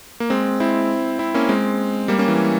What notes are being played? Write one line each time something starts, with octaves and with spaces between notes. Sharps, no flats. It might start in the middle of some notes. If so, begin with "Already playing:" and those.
A#3
G#3 C4
C4 E4
C4 E4
A#3 C#4
G#3 C4
G3 A#3
A#3 C#4
E3